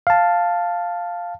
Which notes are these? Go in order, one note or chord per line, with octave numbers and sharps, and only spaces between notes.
F5 A5